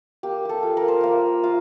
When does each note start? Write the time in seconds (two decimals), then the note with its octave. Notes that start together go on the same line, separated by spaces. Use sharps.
0.23 A#3 G4
0.45 G4 A4
0.63 F4
0.77 A#4
0.88 C5
1.01 A#3 A#4
1.44 F4